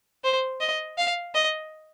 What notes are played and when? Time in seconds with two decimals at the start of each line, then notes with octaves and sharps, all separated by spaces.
0.24 C5
0.61 D#5
0.98 F5
1.35 D#5